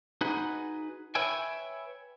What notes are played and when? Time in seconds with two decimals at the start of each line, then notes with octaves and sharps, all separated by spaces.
0.21 D#4 F#4 G#4 B4
1.15 B4 C#5 E5 G5 G#5